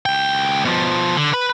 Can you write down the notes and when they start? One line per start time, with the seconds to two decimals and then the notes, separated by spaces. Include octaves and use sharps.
0.06 C#2 G5
0.65 B2 F3
1.17 D3
1.34 B4